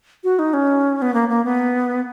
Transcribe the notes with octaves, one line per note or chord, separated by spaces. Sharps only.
F#4
D#4
C#4
B3
A#3
A#3
B3